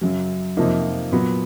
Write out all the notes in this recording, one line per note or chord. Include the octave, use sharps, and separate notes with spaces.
F#2 C#3 F#3
F2 C3 F3 A#3 D#4
A#2 F#3 B3